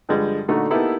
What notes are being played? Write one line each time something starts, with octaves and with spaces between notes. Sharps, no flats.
G2 D3 F3 G3 G#3
A#2 D3 A3 D#4 F#4
A#3 B3 D#4 E4 G4 A4